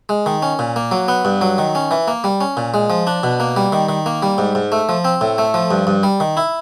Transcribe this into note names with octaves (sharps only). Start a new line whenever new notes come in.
G#3
D#3
C#4
A#2
A#3
F#3
B3
G2
F#3
D#3
C#4
E3
A#3
G3
C#4
A#2
G#3
F3
D4
B2
A#3
G3
D#3
D#3
A#3
G3
G#2
G#2
A3
F3
C4
A2
A3
F3
G2
G2
G3
D#3
E4